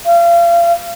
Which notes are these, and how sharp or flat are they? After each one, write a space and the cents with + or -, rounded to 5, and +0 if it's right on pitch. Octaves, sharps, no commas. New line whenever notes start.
F5 -35